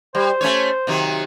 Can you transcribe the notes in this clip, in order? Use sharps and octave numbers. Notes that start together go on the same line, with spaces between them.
G3 C5
A3 C#4 C#5
C3 D#3 F#3